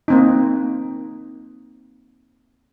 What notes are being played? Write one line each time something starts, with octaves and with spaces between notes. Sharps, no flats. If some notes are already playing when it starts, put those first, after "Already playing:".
A#3 C4 D#4